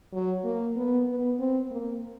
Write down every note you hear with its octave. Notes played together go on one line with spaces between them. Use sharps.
F#3
A#3
B3
B3
C4
A#3